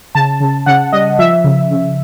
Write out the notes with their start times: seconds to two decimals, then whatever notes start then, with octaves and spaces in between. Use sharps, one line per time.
0.15 C#3 A5
0.40 C#3
0.66 C#3 F#5
0.92 G3 D#5
1.19 F3 E5
1.44 C#3
1.71 C#3